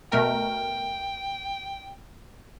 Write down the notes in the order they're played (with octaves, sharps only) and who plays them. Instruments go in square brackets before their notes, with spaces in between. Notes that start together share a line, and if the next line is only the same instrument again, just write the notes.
[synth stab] B2 A3 A#4 [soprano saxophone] G5